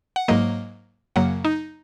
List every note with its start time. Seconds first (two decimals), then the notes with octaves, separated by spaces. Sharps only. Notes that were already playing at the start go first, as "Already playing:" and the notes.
0.16 F#5
0.28 G#2 F#3 A#3 D#5
1.16 F#2 C#3 F#3 A#3 F#5
1.45 D#4